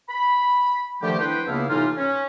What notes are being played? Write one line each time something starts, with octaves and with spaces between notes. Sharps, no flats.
B5
D3 D#3 F3 A3 G4
B3 D4 E4 B4 C5 G5
C#2 C#3 A#3 B3 E4 F5
A2 C3 E3 D#4 F4
C#4